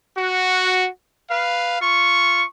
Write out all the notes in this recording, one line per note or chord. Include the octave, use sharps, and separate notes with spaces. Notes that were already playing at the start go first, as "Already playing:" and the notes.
F#4
B4 F5
F4 C#6